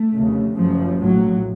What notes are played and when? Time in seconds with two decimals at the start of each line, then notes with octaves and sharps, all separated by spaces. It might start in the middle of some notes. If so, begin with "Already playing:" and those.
Already playing: A3
0.14 F1 D#2 C#3
0.58 F#1 F#2 C#3 F3
1.02 A#1 A2 F#3